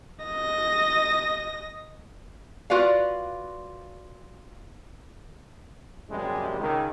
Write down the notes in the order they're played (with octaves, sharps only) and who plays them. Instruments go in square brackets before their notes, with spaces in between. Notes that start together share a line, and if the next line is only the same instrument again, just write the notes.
[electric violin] D#5 A#6
[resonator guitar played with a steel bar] F4 F#4 B4 D5 F5
[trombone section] A#1 F#2 C3 G3 G#3
C#2 D#3